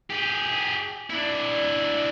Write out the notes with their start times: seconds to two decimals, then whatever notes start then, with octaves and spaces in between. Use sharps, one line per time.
0.10 G4 G#4
1.10 D4 E4